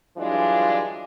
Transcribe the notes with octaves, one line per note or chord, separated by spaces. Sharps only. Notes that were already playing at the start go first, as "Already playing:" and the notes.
G2 E3 F#3 G#3 D4 F4